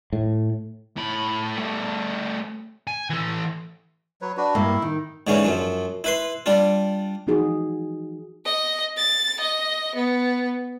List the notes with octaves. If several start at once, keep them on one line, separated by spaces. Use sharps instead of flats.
A2
A2 B5
G3 A3
G#5
E3 A4
F#3 B4 C#5
D4 F#4 B4
G2 A#3 E4
D#3
G#2 D3 E3 C#4
F#2 F3
E4 B4 C6
G3 D4 F4
E3 F3 D#4 F#4 G#4
D#5
A6
D#5
B3